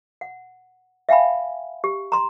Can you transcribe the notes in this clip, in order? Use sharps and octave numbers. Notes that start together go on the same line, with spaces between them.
F#5
E5 F5 G5 G#5 B5
G4
A#5 C6